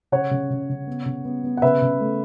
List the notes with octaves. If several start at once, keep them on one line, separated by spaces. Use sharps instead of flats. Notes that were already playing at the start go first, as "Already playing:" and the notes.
C#3 C#5 F#5
C#3
C#3
C#3
B3
C#3
B3
B3
F#5
C#3 B4 E5
C#3
A3